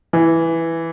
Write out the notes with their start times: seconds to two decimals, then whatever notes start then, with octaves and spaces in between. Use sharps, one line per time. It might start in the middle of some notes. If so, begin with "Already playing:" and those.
0.13 E3